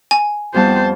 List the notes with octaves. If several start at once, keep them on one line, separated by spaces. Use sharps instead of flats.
G#5
F2 G3 B3 C5 A5